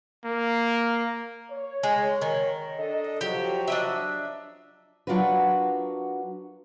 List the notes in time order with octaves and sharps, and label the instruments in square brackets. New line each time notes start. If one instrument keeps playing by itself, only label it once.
[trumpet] A#3
[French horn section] C#5
[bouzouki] G#3
D#3
[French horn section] D4 A4 D#5
[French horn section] F3 F#3 [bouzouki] G4
[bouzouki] D4 D#5 E5
[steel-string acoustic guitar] F#3 D4 F4 F#4 A#4 B4